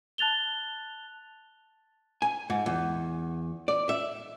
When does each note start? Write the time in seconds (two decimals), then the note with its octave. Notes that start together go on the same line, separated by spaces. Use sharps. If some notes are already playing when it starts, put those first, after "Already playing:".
0.18 A5 F#6 A6 F7 G7
2.22 G#5
2.50 G#2
2.66 E2
3.68 D5
3.89 E5